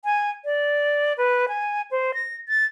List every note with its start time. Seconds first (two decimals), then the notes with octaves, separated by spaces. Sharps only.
0.05 G#5
0.45 D5
1.18 B4
1.48 G#5
1.91 C5
2.14 A#6
2.49 A6